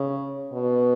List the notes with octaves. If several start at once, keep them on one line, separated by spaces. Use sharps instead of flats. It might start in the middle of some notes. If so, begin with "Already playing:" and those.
Already playing: C#3
B2